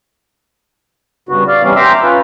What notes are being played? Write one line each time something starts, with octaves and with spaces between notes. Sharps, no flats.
G2 C#3 B3 F#4
D5 F5
C3 E3 G3 B3 C#4
E5 G5 A#5 C6 D6 E6
C#4 F4 B4